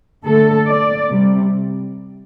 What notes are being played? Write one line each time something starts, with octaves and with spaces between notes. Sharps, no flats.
D3 A3 A4
D5
C3 G3